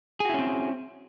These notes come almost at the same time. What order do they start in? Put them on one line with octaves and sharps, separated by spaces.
G#4 F#4 E4 C#4 C4